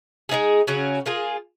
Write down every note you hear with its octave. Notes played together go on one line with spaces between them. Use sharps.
G#3 B3 D#4 G#4
C#3 F#3 C#4 F#4
A#3 F4 G#4